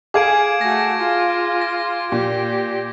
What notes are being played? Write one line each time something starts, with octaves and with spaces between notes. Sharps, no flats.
G#4 F5 G#5 D6 G#6 D7
A3 F#4 A#6
F4
A#6
A#2 G4